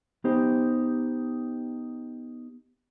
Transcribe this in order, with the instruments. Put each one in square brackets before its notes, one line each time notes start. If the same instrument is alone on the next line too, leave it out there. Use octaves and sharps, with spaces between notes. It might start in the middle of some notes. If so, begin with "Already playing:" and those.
[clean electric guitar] B3 D#4 G4 C5